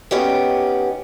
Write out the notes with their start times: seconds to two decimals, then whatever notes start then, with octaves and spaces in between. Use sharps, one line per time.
0.11 B3 C#4 D#4 G4